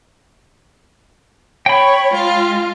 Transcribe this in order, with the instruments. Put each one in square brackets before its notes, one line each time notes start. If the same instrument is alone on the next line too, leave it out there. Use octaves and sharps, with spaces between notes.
[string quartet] C#5 [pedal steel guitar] G5 B5
[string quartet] G#3 F4